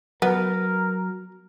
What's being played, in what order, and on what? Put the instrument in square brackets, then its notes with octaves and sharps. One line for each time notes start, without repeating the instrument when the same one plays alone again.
[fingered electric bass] F#3 [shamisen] B3 [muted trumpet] A#4